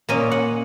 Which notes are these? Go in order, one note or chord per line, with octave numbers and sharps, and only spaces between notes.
A#2 A#3 C#4 D#5
F#5